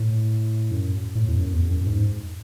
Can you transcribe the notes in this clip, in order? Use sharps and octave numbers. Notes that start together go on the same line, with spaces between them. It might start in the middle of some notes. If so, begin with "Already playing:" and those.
Already playing: A2
F#2
A2
E2
F#2
E2
F#2
F#2
G#2